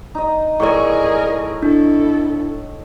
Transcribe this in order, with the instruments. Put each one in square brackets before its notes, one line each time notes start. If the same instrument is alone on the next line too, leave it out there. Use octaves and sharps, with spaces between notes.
[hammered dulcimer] D#4 D#5
[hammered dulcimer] A2 C#5 [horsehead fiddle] G#4 A#4 [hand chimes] D5 C#6
[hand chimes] D4 [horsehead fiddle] E4 A4